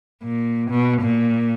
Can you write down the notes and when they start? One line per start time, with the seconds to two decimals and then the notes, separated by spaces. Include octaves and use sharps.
0.23 A#2
0.70 B2
1.01 A#2